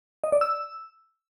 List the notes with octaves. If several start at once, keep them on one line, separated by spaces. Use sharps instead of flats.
D#5
D5
E6